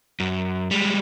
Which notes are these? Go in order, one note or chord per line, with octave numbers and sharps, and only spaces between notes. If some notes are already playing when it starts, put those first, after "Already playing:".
F#2
G3 G#3